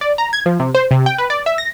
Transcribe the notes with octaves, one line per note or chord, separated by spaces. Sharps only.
D5
A#5
G#6
F3
C3
C5
C3
G5
B4
D5
E5
A#6